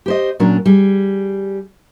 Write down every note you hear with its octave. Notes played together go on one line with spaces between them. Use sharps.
G4 C5 D#5
A#2 F#3 C#4 D4 A#4
G3 G#4